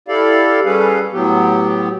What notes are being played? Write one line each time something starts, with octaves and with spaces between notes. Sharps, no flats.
E4 G4 A4 D5 F5
G3 C#4 G#4 A4 B4 F5
A2 F#3 B3 G4